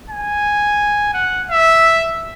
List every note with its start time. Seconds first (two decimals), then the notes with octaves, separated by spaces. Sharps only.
0.10 G#5
1.14 F#5
1.51 E5